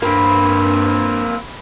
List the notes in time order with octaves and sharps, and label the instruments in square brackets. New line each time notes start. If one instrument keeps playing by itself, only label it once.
[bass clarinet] G2 [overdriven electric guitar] A#3 C4 [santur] B4